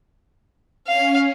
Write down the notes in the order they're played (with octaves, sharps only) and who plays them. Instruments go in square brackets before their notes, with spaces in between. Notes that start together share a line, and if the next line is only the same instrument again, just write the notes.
[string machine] C#4 [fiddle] F5